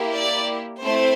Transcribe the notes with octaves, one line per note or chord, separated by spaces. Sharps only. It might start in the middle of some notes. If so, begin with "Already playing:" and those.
Already playing: A#3 E4 G4
D5
A3 C4 E4 C5